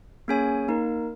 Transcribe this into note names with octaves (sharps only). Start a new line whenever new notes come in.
A#3 C#4 G#4 C#5 G#5
A#3 D#4 A#4